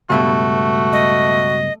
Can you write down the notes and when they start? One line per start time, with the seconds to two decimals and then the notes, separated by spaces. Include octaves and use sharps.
0.10 C#2 G2 B2 A3 F#4
0.93 D#5